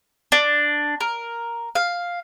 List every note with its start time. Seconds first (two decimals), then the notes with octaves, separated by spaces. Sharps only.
0.32 D4
1.01 A#4
1.75 F5